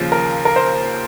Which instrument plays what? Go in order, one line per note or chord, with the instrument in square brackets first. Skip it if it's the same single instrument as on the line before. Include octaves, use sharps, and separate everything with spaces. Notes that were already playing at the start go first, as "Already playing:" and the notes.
Already playing: [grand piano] D#2 C#3 F3
A#4
A#4
C5